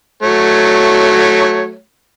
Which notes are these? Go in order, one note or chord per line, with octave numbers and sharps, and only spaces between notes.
F#3 A3 C#5